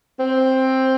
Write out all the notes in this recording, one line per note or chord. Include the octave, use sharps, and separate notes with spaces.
C4